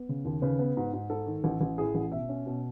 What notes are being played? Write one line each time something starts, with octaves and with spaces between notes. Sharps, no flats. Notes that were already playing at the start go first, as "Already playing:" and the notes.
Already playing: B3
C#3
D#2
C#3 B4
B3
G#2
G#2
G#2 A4
D#3
A1
A1
A2 G#4
A1
B2 E5
C#4
B2